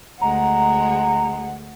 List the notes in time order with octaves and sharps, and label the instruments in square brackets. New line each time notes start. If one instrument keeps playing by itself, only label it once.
[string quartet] D2 G#3 [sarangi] F#5 [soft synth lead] A#5